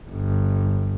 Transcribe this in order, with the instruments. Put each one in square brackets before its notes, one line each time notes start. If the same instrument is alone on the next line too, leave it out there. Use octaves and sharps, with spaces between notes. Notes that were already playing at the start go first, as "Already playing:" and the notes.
[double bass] G1